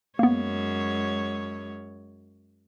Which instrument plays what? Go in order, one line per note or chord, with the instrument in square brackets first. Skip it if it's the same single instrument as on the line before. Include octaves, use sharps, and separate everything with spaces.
[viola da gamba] F#2 G#3 C#5 [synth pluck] A#3 B3